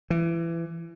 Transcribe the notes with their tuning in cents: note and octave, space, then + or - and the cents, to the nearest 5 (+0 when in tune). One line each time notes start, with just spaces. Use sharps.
E3 +25